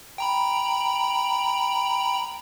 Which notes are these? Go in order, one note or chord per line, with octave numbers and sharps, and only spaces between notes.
G5 A#5 B5